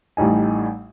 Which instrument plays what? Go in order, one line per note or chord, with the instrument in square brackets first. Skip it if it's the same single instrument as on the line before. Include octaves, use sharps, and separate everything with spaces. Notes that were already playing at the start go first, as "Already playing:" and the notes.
[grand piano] A1 A2 G3 D#4 G#5